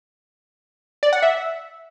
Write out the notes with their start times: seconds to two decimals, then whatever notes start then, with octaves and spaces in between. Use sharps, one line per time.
1.03 D5
1.13 F#5
1.22 E5